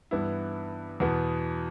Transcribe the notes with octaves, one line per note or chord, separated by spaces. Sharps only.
G2 E3 B3 E4
E2 B2 B3